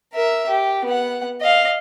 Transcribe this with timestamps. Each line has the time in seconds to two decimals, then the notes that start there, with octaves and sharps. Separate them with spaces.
0.13 A#4 E5
0.49 G4
0.85 B3 F#5
1.41 D#5 F5